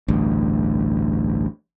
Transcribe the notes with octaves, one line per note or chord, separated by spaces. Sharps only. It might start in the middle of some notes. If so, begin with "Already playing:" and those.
A1 D2 G2